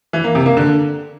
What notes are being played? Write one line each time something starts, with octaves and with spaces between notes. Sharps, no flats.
E3
A#3
C3
A#3
D3